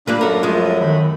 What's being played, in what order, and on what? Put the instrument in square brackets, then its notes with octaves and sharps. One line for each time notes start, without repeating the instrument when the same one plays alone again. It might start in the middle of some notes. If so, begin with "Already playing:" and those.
[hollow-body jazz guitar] A#2 G3 A#3 [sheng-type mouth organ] D4 F5 [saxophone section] B4
[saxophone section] F#2 [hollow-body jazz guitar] A4 A#4
[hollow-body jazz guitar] F3 G#3 [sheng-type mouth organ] A3 F4 D#5
[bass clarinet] D#3 [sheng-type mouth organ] A3 B5